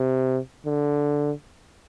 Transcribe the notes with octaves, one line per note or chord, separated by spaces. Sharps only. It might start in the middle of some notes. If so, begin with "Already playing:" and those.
Already playing: C3
D3